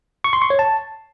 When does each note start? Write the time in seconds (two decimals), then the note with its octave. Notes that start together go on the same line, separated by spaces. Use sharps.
0.24 C#6
0.33 C6
0.42 C#6
0.50 C#5
0.59 A5